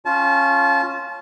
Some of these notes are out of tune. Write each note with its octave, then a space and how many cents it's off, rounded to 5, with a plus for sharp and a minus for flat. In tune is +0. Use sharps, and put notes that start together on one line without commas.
C#4 -10 F4 +0 A5 -30